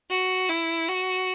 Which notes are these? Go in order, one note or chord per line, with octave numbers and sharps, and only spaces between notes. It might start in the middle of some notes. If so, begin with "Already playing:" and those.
F#4
E4
F#4